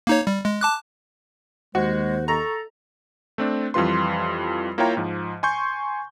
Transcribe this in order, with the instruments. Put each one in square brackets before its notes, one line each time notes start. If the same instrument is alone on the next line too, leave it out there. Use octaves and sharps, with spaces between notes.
[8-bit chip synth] A#3 D#4 C#5
G3
G#3
A5 D6 F#6
[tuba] D#2 [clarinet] G#3 [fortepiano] F#4 [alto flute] C5
[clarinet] A4 [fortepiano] A#5 [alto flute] C#6
[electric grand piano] A3 C4 D4
F2 E3 G3 F4 B4 C6
A#3 E4 F4 C#5 G5 A#5
G#2 F3
G#5 C6 C#6 G6